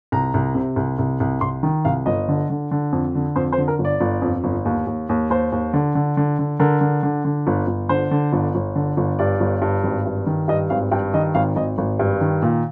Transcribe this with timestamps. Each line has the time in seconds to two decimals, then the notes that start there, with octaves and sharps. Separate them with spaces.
0.12 C2 A#5
0.34 C2
0.55 C3
0.76 C2
0.99 C2
1.20 C2
1.41 C2 C6
1.63 D#3
1.85 C2 F5
2.06 G1 D#5
2.28 D3
2.50 D3
2.71 D3
2.92 F2
3.15 D3
3.36 F2 C5
3.52 C5
3.58 D3
3.68 A#4
3.79 G1
3.85 D5
4.01 G1
4.22 F2
4.44 G1
4.65 D#2
4.87 D#2
5.09 D#2
5.30 D#2 C5
5.52 D#2
5.73 D3
5.95 D3
6.17 D3
6.39 D3
6.60 D3 A#4
6.81 D3
7.03 D3
7.25 D3
7.47 G1
7.67 G1
7.89 D3 C5
8.11 D3
8.33 G1
8.55 G1
8.75 D3
8.97 G1
9.19 G2 D5
9.40 G1
9.62 G2
9.83 G#1
10.06 G2
10.27 D#3
10.48 G2 D#5
10.70 G#1 F5
10.91 G2 G5
11.14 D#3 D#5
11.35 G#1 F5
11.56 G#1 D#5
11.78 G#1
11.99 G2
12.21 D#3
12.42 A#2